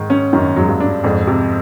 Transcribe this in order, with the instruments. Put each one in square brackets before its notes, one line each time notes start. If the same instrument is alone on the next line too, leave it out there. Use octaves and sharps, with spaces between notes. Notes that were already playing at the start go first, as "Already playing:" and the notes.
Already playing: [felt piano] G#2 [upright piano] D#3
[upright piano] C#4
[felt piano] F#2 [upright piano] D#3
[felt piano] G#2 [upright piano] F#3
[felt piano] G2
[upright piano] D4
[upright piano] F2 [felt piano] G#2
[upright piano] C3